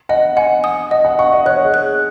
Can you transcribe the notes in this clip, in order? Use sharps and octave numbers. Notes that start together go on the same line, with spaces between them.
D#5 F#5
F#5 G#5
D#6
D#5 F#5
F#5
F#5 C#6
D#5
C#5 F#6
G#4
F#6